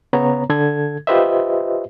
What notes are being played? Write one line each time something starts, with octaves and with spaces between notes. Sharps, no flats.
C#3 B3 C#5 A#5
D3 A4 G#6
F4 G4 B4 C5 D#5 E5